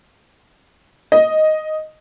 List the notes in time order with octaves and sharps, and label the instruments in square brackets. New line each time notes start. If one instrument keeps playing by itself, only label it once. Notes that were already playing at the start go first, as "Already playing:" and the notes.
[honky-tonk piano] D#5